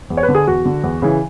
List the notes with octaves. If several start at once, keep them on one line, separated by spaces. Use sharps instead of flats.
E2
C#5
B4
D3
G#4
E2 F#4
D3
E2
C#3 E3